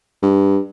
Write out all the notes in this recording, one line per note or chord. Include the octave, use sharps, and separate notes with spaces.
G2